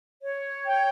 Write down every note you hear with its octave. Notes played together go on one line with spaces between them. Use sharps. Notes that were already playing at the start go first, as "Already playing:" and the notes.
C#5
G5